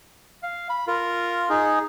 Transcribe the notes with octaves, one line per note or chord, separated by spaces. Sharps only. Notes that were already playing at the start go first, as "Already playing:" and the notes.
F5
B5
F4 A#4
D#4 G#4